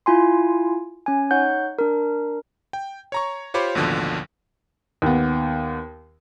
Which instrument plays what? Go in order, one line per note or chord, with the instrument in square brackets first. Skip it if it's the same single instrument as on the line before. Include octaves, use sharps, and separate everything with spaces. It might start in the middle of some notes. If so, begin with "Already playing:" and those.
[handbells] E4 F4 G#5 C6
C#4 G#5
D#4 C#5 F#5 G6
D4 A#4
[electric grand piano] G5
C#5 A#5 C#6
F4 G4 C5 C#5 B5 D6
A1 D#2 B2 D3 F3
[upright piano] D#2 B3